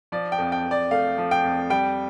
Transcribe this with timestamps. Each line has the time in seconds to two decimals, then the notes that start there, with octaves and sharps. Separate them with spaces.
0.12 F3 D5
0.32 G5
0.38 F2
0.52 G5
0.65 F2
0.71 D5
0.91 A3 F5
1.18 F3
1.31 G5
1.44 F2
1.70 G3 G5